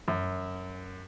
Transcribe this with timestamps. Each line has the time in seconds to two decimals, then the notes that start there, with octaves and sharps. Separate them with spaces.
0.08 F#2